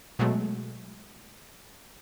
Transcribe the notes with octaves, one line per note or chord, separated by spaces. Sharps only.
B2 F#3 G#3 A3